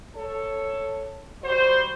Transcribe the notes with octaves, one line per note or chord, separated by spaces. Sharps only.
A4 C#5
G3 F#4 C5